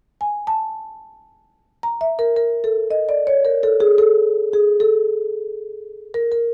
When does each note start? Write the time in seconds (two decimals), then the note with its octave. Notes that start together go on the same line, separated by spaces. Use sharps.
0.21 G#5
0.47 A5
1.83 A#5
2.01 E5
2.19 A#4
2.36 A#4
2.64 A4
2.91 D#5
3.09 D5
3.27 C#5
3.45 A#4
3.63 A4
3.80 G#4
3.98 A4
4.53 G#4
4.80 A4
6.14 A#4
6.32 A#4